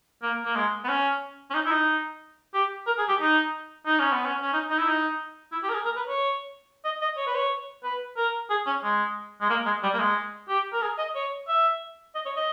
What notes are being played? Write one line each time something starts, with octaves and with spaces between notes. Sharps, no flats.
A#3
A#3
G#3
B3
C#4
C#4
D#4
E4
D#4
G4
A#4
G#4
G4
D#4
D#4
C#4
B3
C#4
C#4
D#4
D#4
E4
D#4
E4
G4
A#4
G#4
A#4
B4
C#5
D#5
D#5
C#5
B4
C#5
B4
A#4
G#4
C#4
G#3
G#3
A#3
G#3
G3
A#3
G#3
G4
A#4
G#4
D#5
C#5
E5
D#5
C#5
D#5